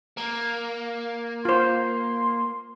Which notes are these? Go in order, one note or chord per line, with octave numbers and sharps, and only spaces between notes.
A#3
F4 C5 C6